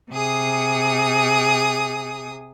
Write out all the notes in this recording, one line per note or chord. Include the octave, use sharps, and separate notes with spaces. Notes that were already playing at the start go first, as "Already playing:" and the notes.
C3 G#4 D#6